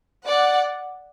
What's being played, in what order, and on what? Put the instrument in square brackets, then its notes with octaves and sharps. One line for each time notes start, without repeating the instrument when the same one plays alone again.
[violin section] D5 F#5